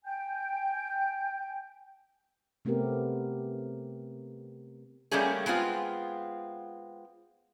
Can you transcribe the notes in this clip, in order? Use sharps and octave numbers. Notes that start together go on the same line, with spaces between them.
G5 G#5 G6
C3 A3 B3 C4 G4 A#4
G3 A3 A#3 C#4 G4 G#4
G#3 B3 C4 F4